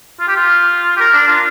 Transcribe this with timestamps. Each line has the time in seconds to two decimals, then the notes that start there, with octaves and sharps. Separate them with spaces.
0.20 F4
0.28 G4
0.36 F4
0.97 G4
1.01 A#4
1.14 D4
1.27 F4